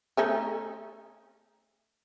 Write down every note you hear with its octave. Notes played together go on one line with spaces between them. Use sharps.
A3 C#4 D#4